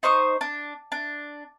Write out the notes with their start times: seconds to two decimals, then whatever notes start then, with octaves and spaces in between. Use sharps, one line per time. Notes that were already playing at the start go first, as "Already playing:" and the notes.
0.03 D#4 C5 C#6 D#6
0.41 D4
0.92 D4